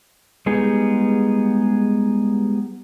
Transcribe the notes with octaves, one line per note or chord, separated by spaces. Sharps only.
G3 G#3 B3 D#4 G#4